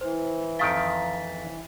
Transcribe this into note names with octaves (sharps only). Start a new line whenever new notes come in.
E3 C5
F2 D#3 F5 G5 A6 B6